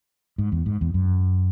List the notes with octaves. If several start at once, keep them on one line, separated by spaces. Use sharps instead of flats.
G#2
E2
G#2
E2
F#2